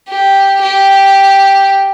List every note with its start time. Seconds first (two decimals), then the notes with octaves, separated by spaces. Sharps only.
0.09 G4
0.62 G4